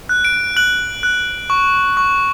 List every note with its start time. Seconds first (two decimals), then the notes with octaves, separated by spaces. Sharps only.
0.09 F#6
0.25 D7
0.56 F#6 F#7
1.03 F#6
1.50 C#6
1.97 C#6